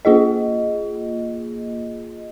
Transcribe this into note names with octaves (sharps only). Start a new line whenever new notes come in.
A#3 F4 G#4 D#5